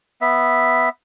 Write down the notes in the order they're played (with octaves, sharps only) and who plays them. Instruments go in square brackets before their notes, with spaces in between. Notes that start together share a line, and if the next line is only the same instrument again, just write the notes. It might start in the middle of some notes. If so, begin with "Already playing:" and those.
[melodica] B3 E5